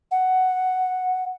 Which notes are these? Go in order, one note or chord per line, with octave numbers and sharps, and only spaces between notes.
F#5